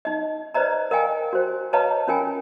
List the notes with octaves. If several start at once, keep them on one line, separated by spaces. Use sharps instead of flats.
D#4 D#5
B4 C5 D5 D#5 A#5
A#4 D#5 F5 G5 G#5
F#4 C5
B4 C#5 D#5 F5 A5 A#5
C#4 F4 A#4 G5 G#5